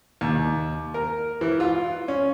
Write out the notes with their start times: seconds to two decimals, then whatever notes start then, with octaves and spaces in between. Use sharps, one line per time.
0.21 D#2
0.94 A#4
1.41 E3
1.60 F4
2.08 C#4